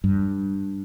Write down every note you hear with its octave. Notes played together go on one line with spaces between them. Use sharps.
G2